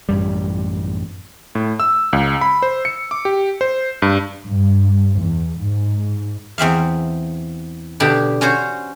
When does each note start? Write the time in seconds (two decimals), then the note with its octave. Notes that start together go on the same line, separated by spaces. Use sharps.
0.09 A1 F#2 G3
1.55 A2
1.80 E6
2.13 C#2
2.41 B5
2.62 C5
2.85 C#7
3.11 D6
3.25 G4
3.61 C5
4.02 G2
4.47 G2
5.18 E2
5.58 G#2
6.58 E2 C4 E5 F5
8.00 B2 D3 G4 B5
8.41 C#4 F#4 C5 C#5